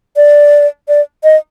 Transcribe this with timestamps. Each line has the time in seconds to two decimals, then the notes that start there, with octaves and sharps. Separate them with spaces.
0.16 D5
0.88 D5
1.24 D#5